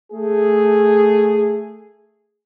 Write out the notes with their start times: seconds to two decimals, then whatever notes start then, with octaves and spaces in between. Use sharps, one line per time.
0.12 A3 G#4